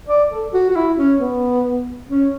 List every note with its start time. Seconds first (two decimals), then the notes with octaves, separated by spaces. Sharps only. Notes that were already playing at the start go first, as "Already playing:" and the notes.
0.08 D5
0.31 A4
0.53 F#4
0.70 F#4
0.76 E4
0.98 C#4
1.19 B3
2.10 C#4